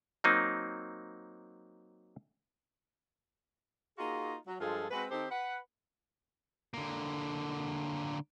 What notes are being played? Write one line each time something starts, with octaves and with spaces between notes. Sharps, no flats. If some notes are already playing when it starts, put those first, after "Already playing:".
F#3 A#3 C4 D#4
A#3 D#4 F4 F#4 G#4
F#3
G2 F3 G#3 F4 G#4 A4
G#3 C4 F#4 B4
D#3 C4 D#4 G4 A4 C5
B4 F#5
D3 A#3